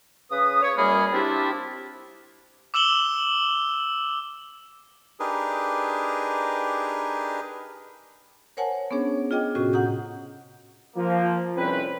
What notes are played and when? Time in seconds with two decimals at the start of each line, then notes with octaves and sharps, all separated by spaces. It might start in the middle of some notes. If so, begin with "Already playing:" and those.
0.32 C#3 B4 D#6
0.62 C#5
0.77 F#2 G3 A#3 G#4 B5
1.13 C4 D4 E4 F4 G4
2.74 D6 E6 E7 F#7 G7
5.20 D4 D#4 G4 G#4 A#4 B4
8.57 A#4 C5 C#5 F#5 G#5 A5
8.91 B3 C#4 D4 G#4 C#5
9.31 F4 G#4 D#5 G5 D6
9.55 A2 C3 C#4 F#4
9.73 F#5 A#5 D#6 G6
10.96 F3 A#3
11.56 C2 F2 C4 C#4 B4